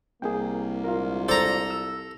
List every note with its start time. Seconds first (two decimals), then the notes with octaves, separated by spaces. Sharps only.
0.22 C2 A#3 G#4 G5
0.84 A#1 G#3 F4 A#4 F5
1.29 A4 C5 D5 A#5
1.71 E6